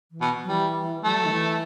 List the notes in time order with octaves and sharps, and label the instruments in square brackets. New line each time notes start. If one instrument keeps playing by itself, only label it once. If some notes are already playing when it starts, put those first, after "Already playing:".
[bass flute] E3
[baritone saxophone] B2
[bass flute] F#3
[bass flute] E3 [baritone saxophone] G3
[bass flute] F#3 [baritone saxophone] A3
[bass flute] G3
F#3
D#3
E3